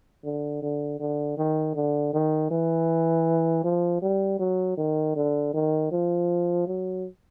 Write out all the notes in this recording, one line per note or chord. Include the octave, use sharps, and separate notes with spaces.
D3
D3
D3
D#3
D3
D#3
E3
F3
G3
F#3
D#3
D3
D#3
F3
F#3